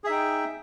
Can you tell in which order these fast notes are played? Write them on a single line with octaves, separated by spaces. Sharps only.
G#4 E5 D#4 G5